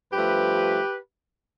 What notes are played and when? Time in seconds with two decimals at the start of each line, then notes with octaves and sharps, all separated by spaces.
0.12 G2 F3 A3 G4 B4